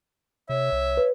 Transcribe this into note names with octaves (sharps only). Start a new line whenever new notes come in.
C3 C#5 E5
C2
B4